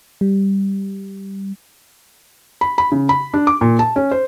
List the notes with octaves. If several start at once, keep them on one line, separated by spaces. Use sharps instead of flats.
G3
B5
B5
C#3
B5
D4
D6
A#2
A5
C#4
C5